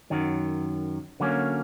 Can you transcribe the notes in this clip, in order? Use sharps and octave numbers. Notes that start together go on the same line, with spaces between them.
F#2 D#3 F#3
D3 F#3 A#3 C#4